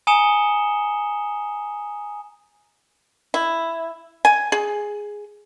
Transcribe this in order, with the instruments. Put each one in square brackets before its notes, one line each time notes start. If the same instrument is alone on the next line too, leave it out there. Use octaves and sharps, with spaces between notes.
[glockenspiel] G#5 A#5 D#6 C#7 E7 G7
[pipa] E4
G#5
G#4